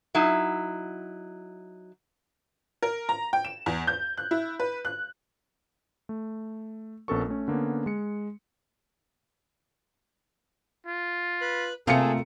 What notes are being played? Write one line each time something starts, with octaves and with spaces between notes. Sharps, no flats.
F#3 D#4 E4
A#4
A#5
G5
E7
E2
G6
F#6
E4
B4
F#6
A3
A#1 B3 C#4 A4 A#4 C#6
A3 C#4
D3 A#3 B3 C#4
G#3 C#7
F4
B4 B5
C3 A3 A#3 F4 G#4 A4 F5 C#7